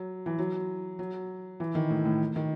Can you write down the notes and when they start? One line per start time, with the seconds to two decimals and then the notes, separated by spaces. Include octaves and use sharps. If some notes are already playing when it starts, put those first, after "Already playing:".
Already playing: F#3
0.26 E3
0.39 F#3
0.99 F#3
1.60 E3
1.75 D#3
1.90 A2
2.05 A2
2.36 D#3